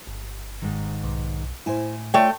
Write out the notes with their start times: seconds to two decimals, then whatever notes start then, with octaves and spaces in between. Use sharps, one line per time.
0.07 G1
0.62 G#2 D#3
1.03 B1
1.66 A2 E4 C5 G#5
2.14 A3 F4 C#5 D5 E5 G5